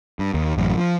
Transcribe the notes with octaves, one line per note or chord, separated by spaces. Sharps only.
G2
D#2
A1 F#2
F3